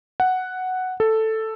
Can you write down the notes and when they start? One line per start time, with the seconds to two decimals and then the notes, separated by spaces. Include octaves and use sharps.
0.20 F#5
1.00 A4